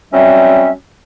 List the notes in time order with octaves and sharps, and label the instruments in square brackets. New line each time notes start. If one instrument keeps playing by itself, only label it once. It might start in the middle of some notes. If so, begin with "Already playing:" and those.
[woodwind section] F#3 G3 C4 C#4 E5